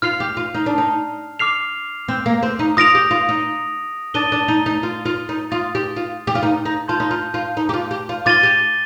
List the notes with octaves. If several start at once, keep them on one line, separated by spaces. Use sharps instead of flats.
F4 F6 C7 F7
G4
F4
D#4
D4
D#4
D6 F6 C7 F7
C4
A#3
C4
D#4
F4 D#6 A#6 D7 F7
G4
F4
D#4
D4 D#6 A6 D#7 G7
D4
D#4
D#4
F4
F4
D#4
F4 C6 D#6 A6
G4
F4
G4
F4
D#4
D#4
F4 A5 C6 G6
D#4
F4
F4
D#4
G4
F4
G4
F4
F4 D6 A6 D#7 G7
G4